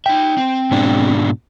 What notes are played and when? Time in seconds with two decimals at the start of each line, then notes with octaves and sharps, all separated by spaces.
0.06 D#4 E5 G5
0.37 C4
0.71 G#2 B2 D4